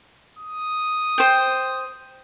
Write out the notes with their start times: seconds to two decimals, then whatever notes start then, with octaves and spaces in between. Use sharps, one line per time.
0.39 D#6
1.18 C5 G5